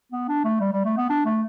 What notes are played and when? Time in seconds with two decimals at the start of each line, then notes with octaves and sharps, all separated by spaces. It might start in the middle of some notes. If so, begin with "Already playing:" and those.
0.12 B3
0.29 D4
0.44 A3
0.60 G3
0.72 G3
0.85 A3
0.97 B3
1.10 D4
1.25 A3